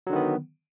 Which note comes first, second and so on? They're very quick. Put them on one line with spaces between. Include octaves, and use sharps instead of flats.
F#3 D3 D#3 B3